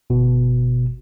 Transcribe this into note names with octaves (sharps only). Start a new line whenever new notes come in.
G1 B2